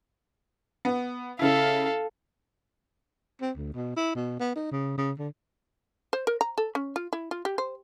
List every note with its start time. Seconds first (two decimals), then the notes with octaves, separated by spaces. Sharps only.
0.85 B3
1.39 C#3 E4 A4 F5
3.41 C4
3.57 D2
3.73 B2
3.96 E4
4.15 B2
4.40 B3
4.56 D#4
4.72 C#3
4.98 C#3
5.19 D3
6.13 C5
6.27 A#4
6.41 A#5
6.58 A4
6.75 C#4
6.96 F4
7.13 E4
7.31 F4
7.45 G4
7.58 C5